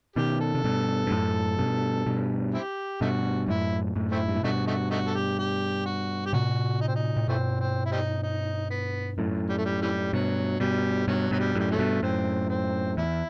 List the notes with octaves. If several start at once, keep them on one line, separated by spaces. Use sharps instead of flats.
B2 D#3 G4
A4
C3
G2 B2
G2
F#2 A2
G2 B2
G2 B2
C4 E4 G4
G2 B2 A3 D#4 F#4
F#2 A2 E4
F#2 A2
A3 C4 E4
G2
A2
G2 B2 A3 D#4 F#4
A3 D#4 F#4
A3 D#4 F#4
A4
G4
G4
F#4
G4
A2 C3 F#4
D#4
C4
D#4
A2
G2 B2 E3 A3 C4
C4
E4
G3 C4 D#4
D#4
B3
F#2 A2
G3
A3
G3
C3 E3 G3
G2 B2 F#3
G2 B2 G3
G2 B2 D#3 F#3
G2 B2 F#3
G3
F#2 A2 G3
C3 F#3 A3
G2 B2
F#2 A2 C4
C4
E2 E4